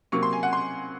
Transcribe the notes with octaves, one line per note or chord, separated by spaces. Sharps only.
C3 F#3 A#3 C#6
C6
G#5
F#5
C6